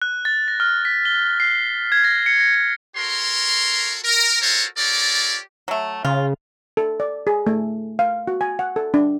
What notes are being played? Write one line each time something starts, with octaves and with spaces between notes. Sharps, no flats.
F#6
A6
A#6
F6
B6
G7
C7
G#6
A#6
C#7
A#6
C#7
F#4 A4 A#4 C#5 C6
A#4
F4 F#4 A4 A#4 C5 C#5
F4 G4 A4 A#4 C#5 D5
F#3 A3
C#3 F4
A4
D5
G#4
A3
F5
F#4
G#5
F#5
A4
D4